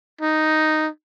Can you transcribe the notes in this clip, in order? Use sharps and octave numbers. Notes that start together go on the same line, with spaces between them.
D#4